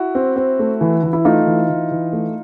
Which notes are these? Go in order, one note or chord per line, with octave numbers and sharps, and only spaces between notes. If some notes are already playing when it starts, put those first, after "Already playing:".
Already playing: E4 F#4
C4
C4
A3
E3
E3
E4
A3 D#4 F4
E3
E3
E3
A3